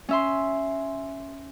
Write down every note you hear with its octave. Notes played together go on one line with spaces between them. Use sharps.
C#4 E5 C6